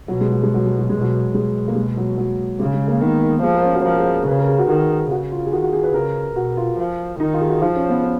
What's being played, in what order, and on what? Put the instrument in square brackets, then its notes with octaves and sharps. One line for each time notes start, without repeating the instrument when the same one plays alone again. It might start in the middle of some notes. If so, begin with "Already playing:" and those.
[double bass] B2 [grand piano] F#3
[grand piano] G#3
F#3
G#3
F#3
G#3
F#3
[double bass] B2 [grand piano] G#3
[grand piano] F#3
[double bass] B2 [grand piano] G#3
[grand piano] A#3
G#3
F#3
F#3
[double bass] C#3 [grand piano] G#3
[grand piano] G#3
A#3
[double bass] D#3 [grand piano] B3
[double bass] F3 [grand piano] G#4
[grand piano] A#4
C#4
F#4
[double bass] F3 [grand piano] A#4
[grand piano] G#4
[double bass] C#3 [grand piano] B4
[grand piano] A#4
G#4
F#4
[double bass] D#3 [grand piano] F#4
[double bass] C#3 [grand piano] F#4
[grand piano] F4
G#4
[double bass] D#3 [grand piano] F#4
[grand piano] F#4
G#4
B4
[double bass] C#3 [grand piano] A#4
[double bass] B2 [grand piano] F#4
[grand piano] F4
[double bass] F3
[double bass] D#3 [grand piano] D#4
[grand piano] F4
G#4
F#4
[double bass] F3 [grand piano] F4
[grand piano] C#4
B3
C#4